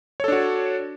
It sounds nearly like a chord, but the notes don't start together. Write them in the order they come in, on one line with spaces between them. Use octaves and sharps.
C#5 A4 D4 F#4